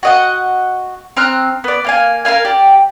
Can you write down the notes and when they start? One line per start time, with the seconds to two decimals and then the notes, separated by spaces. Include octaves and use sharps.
0.03 F#4 D#5 F#5
1.17 C4 A#5 F6 F#6
1.64 B3 D5
1.84 A#3 F5 G#5
2.25 A#4 B4 F5 G#5
2.45 G4 D5